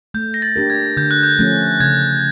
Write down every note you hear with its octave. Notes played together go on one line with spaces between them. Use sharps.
A3 G6
A#6
A6
D4 G4 A#4
G#6
D3 G6
F#6
G6
F3 A3 C#4
C#3 G#6